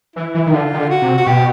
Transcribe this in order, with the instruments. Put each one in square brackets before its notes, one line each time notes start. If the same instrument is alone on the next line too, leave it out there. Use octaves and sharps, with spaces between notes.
[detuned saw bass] E3 [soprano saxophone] E4
[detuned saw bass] E3
D#3
[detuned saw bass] D3 [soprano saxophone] F4
[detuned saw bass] D#3
D3
[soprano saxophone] F#4
[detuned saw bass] C3
[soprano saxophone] F#4
[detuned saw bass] B2 [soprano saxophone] G4